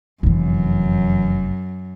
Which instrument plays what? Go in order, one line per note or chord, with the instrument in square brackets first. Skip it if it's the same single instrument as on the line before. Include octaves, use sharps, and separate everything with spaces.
[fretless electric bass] F1 [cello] F#2 [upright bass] D3 E3